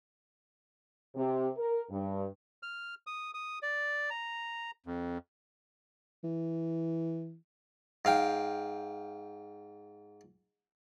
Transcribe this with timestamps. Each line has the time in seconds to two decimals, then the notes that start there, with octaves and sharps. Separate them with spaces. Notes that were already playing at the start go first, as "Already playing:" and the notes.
1.15 C3
1.57 A#4
1.90 G2
2.63 F6
3.07 D#6
3.34 D#6
3.63 D5
4.10 A#5
4.86 F2
6.24 E3
8.05 G#2 F5 G5